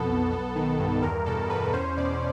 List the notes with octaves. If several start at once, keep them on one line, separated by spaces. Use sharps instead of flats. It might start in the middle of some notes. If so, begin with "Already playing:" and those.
Already playing: F2 B2 B3 A4
B1
B3
D#3
G2
E2 A#4
B2 A4
E2 B4
C#4 C5
B2 D5